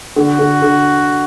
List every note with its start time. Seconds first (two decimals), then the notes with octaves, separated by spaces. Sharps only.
0.16 D3 F#4
0.39 D3
0.62 D3